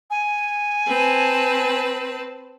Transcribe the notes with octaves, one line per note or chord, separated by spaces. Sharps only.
G#5
C4 B4 A5